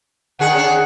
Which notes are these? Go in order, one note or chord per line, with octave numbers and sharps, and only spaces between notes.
D3 D#3 G#4 F#5
C#4 D4 G#4